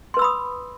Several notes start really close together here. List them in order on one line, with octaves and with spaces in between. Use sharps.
C6 B4 E6 B5 D#6